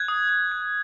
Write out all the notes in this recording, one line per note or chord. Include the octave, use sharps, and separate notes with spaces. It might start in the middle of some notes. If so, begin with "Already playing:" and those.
Already playing: F#6 G#6
D#6
D#6
F#6